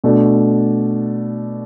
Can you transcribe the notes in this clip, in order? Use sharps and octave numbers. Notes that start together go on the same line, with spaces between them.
B2 A3 D4